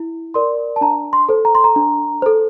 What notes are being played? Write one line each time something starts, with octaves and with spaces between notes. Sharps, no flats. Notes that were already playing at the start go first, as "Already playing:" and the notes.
Already playing: E4
A#4 D5 C6
A5
D4 A#5
C6
A4 C5
A#5
C6
A#5
D4
A4 C5